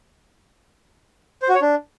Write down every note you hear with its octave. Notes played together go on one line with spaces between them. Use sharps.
C5
F#4
C#5
D4